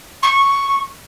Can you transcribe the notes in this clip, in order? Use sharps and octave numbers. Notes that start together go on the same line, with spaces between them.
C#6